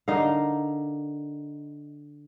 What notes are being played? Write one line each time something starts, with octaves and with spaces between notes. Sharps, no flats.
D3 D#4 A#4 F5